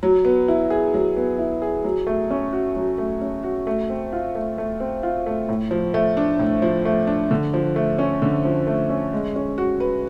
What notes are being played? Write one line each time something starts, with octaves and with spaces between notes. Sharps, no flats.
F#3
B3
E4
G#4
F#3
B3
E4
G#4
F#3
A3
C#4
F#4
F#3
A3
C#4
F#4
A3
C4
F4
A3
A3
C4
F4
A3
A2
F3
A3
D4
A2
F3
A3
D4
D3
F3
A3
C#4
D3
F3
A3
C#4
G#3
C#4
F#4
B4